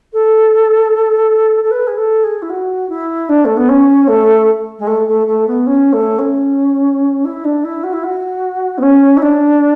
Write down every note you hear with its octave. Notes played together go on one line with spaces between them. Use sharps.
A4
A4
B4
G#4
A4
G#4
E4
F#4
E4
D4
A3
B3
C#4
A3
G#3
A3
A3
A3
B3
C#4
A3
C#4
E4
D4
E4
F#4
E4
F#4
B3
C#4
E4
D4